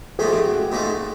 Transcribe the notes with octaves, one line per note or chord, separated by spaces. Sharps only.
A#1 G#2 F3 A3 G#4
G4
F#4
G4
A#1 G#2 F3 A3